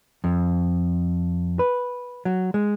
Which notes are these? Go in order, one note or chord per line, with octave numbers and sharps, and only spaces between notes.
F2
B4
F#3
G#3